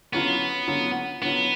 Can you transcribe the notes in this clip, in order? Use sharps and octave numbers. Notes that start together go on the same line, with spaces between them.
D3 F#3 B3 C#4 F4
D3 F#3 C#4 F4
D3 F#3 B3 C#4 F4